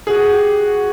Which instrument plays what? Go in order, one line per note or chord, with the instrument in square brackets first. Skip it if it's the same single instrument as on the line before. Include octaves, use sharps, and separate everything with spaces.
[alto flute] F#4 [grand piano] G#4
[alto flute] G4
F#4